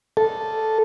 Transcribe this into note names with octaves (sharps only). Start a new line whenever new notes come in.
A4